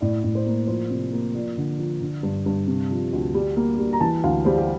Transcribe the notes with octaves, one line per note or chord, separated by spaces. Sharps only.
A2 D5
A2
C5
A#3
F3 C5
C3
A#3
F3 D5
D3
F3
D3
G2
G2
C3
F3
D2
G3
A#3
G3
A#5
E3 A5
D2 F5
G3 C5
G4